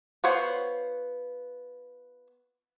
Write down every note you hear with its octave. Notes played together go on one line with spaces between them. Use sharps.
B3 F4 C5 C#5 F#5